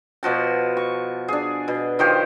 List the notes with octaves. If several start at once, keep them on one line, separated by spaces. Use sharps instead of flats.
B2 F3 F#4 A5
C#6
D4 G#4
B2
D#3 F3 G4 C5